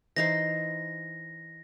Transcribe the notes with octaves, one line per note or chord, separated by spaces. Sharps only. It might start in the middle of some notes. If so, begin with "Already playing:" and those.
E3 D#4 C5 A#6